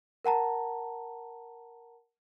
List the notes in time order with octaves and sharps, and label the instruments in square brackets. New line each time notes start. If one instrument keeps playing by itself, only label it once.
[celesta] A#4 F#5 A5 A#5